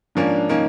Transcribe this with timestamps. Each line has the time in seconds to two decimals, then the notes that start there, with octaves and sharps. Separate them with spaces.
0.15 G#2 F3 A#3 C#4 D4
0.49 F3 A#3 C#4 D#4